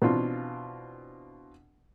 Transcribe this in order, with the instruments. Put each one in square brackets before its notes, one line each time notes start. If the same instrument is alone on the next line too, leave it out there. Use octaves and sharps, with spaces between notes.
[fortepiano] B2 E3 C4 D4 F4